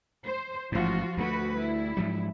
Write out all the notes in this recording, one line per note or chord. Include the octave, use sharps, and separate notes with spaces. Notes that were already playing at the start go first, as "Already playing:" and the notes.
C5
A1 G#2 F3 F4 F#4
D2 F#3 A3 F#4 B4
G3 E4
G#2 F3 F#3